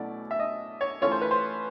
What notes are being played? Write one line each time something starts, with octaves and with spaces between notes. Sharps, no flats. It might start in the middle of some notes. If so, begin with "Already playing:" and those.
Already playing: B2 F#3 A3 C#4 E4 D5
E5
D#5
C#5
E3 A3 C#4 F4 C#5
C5
B4
C5